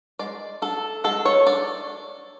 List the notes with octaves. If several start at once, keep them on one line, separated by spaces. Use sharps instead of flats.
G#3 D5
D4 A4
G#3 A4
C#5
D4 D5